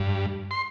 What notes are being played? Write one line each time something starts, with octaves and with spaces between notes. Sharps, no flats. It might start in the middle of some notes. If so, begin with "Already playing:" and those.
Already playing: G2
C6